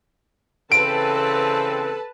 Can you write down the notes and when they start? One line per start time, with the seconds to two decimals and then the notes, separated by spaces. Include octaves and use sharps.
0.72 C#3 E3 C4 A4 B4 A5 D7